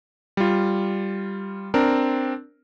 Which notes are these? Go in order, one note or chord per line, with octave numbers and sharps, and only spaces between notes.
G3 F4
C4 D4 A#4